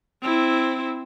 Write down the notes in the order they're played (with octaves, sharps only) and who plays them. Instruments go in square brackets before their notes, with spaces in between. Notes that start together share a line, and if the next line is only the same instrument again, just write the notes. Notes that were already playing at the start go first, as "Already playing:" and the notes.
[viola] C4 E4